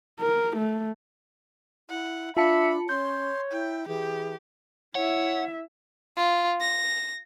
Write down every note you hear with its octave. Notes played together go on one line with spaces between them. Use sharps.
A#4
A3
E4 F#5
D4 F4 E5 A5 B5 C#7
C#4 C#5 C6 G6
E4 G5
E3 G4 G#4
E4 C#5 E5 F#5
F4
A#6